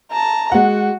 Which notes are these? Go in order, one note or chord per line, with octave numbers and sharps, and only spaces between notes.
A5 A#5
G#3 F#4 F#5